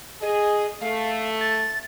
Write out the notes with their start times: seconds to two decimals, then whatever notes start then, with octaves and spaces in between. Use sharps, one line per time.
0.22 G#4 D#5
0.81 A3 F5
1.41 A6